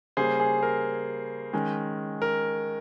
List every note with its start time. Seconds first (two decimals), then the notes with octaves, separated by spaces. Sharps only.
0.17 C#3 G3 A#3 C#4 G#4 C5
0.40 G#4
0.63 A#4
1.53 D#3 G#3 C#4
2.22 A#4